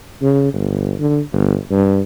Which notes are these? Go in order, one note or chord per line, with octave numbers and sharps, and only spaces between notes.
C#3
G1
D3
G1
G2